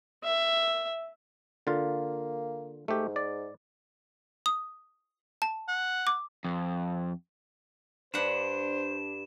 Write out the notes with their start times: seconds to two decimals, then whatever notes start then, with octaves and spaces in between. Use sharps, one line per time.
0.24 E5
1.67 D3 A#3 F4
2.88 G#2 A3 G4
3.16 D5
4.46 D#6
5.42 A5
5.68 F#5
6.07 D6
6.44 F2
8.14 G2 D4 C5 F#5 E7